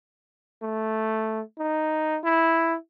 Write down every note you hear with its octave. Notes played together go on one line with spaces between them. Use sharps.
A3
D#4
E4